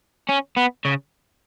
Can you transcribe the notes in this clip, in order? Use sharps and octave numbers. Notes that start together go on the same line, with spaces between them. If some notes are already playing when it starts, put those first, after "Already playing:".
C#4
B3
C#3